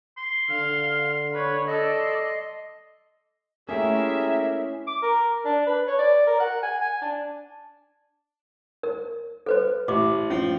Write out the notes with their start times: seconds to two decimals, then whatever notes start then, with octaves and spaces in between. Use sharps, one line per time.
0.18 C6
0.50 D3 F5
1.33 B4 C#5
1.67 A4 D5 D#5
1.99 C6
3.69 A3 A#3 C#4 E4 G4 G#4 A#4 E5
4.87 D6
5.03 A#4
5.45 D4
5.67 B4
5.87 C#5
5.99 D5
6.27 A#4
6.40 F#5
6.63 G#5
6.81 G#5
7.02 D4
8.83 A#4
9.46 A4 B4 C5
9.88 A1 D6
10.30 F3 C#4